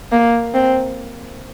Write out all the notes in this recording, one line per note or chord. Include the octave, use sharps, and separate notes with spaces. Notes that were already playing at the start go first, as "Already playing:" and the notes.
A#3
C4